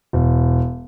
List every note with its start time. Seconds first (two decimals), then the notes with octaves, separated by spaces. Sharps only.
0.13 E1